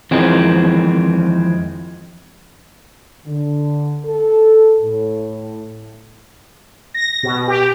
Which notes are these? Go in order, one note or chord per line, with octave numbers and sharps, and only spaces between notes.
F2 D#3 E3 G#3 C4
D3
A4
A2
A#6
B2
G4